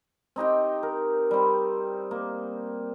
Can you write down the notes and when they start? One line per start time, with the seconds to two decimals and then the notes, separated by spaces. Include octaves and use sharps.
0.36 C4 D#4 G4 G5
0.83 A#4
1.31 G3 C4
2.11 A#3